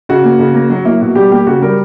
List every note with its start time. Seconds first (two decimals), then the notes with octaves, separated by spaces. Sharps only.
0.09 C#3 F#4
0.24 A#3
0.39 C#3
0.54 A#3
0.70 F#3
0.85 A#3 E4
1.01 B2 F#4
1.15 G3 G4
1.31 A#3 G4
1.47 C#3 F#4
1.62 G3 A#4